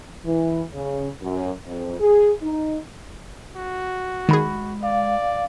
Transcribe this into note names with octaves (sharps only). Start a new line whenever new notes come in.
E3
C#3
F#2
F2
G#4
D#4
F#4
D#3 G#3 G#4 B5
D5 F5